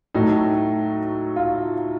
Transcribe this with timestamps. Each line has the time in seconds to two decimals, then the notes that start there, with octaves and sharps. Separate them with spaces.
0.14 A2 F#3 A3 D#4
1.36 F4